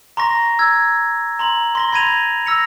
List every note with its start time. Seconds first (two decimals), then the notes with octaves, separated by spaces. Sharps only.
0.17 A#5 C6 C#6 A#6
0.59 E6 G#6
1.39 A#5 C6 F#7
1.75 C6 A#6 G7
1.92 B5 C6 G#6 A#6 D#7 F7
2.46 E6 A#6 C#7 F7